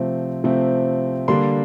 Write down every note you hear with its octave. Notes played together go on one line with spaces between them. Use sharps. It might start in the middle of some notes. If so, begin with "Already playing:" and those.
Already playing: C3 F3 A3 C4
C3 F3 A3 C4
D3 G3 A#3 D4 C6